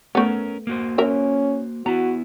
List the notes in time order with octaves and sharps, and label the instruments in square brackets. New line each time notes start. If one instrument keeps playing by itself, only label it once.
[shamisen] A3 B3 [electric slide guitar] C#4 A#4
[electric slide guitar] A#3 F#4 C5
[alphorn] C#4 [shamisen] A#4 E5
[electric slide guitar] B3 E4 [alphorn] F#4 [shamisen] A#5